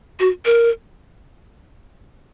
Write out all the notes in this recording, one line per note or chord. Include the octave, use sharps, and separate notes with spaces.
F#4
A#4